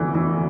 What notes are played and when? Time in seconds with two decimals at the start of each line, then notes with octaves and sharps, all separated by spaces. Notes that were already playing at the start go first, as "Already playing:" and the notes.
Already playing: F1 E2 D3 E3
0.15 E3